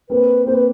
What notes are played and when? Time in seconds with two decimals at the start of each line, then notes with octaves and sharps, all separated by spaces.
0.09 A#3 C4 B4
0.46 A#3 C4 C5
0.54 B4